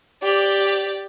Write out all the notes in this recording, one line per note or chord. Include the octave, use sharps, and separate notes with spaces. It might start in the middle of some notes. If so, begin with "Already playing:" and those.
G4 D5